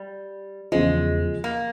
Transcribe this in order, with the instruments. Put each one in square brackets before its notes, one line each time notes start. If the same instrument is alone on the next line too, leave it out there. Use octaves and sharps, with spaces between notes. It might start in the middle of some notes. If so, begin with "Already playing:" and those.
Already playing: [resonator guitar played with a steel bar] G3
[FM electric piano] E2 C#3 F3 [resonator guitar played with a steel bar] G#3
[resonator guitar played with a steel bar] A#3